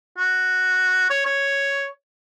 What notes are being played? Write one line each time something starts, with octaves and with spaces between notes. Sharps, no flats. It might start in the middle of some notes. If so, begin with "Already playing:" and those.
F#4
C#5
C#5